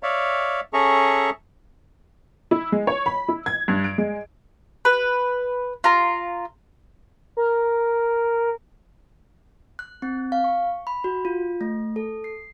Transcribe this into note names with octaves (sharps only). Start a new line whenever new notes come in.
C#5 D5 E5 F5
C#4 G#4 A4 E5 A#5 C#6
E4
G#3
C#5
B5
E4
G#6
G2
D7
G#3
B4
F4 A#5
A#4
F#6
C4
F5
C#6
B5
F#4
F4
A3
A4
C7